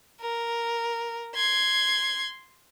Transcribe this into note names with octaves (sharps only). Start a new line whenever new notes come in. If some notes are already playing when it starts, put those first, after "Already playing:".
A#4
C6 G#6